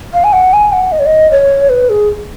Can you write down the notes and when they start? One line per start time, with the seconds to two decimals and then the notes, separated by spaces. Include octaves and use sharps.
0.14 F5
0.24 G#5
0.33 F#5
0.53 G#5
0.72 F#5
0.92 D#5
0.99 C#5
1.06 D#5
1.31 C#5
1.69 B4
1.89 G#4